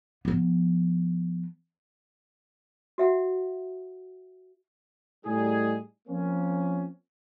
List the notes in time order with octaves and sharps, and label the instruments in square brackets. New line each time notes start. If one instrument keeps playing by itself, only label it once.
[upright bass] F3 B3
[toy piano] F#4 E5 F#5
[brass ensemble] A2 G3 D#4 G#4
F3 A#3 C4 C#4